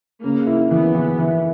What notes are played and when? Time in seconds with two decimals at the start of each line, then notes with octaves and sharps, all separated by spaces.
0.23 C#3 A#3
0.46 E4
0.70 E3 B3
0.95 E3
1.18 E3